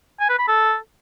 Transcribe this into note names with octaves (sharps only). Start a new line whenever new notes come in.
G#5
B4
B5
A4